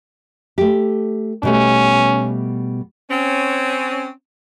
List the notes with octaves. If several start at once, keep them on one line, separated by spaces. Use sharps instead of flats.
A3 G4
B2 G3 A3 C#4
C4 C#4